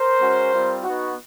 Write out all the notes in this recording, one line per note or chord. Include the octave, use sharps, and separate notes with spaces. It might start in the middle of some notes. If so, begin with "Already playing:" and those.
Already playing: A#4 C5
G#3 C#4 F#4
G3 C4 F4
B3 D#4 F#4